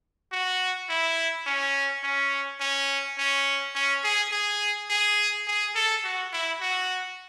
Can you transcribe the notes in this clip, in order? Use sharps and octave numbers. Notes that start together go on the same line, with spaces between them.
F#4
E4
C#4
C#4
C#4
C#4
C#4
G#4
G#4
G#4
G#4
A4
F#4
E4
F#4